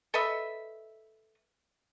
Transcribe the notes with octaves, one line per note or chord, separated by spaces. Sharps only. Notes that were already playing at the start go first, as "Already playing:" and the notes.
A4 B4 D#5 E5